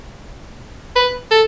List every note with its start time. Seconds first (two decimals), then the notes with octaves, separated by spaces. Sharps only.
0.96 B4
1.31 A4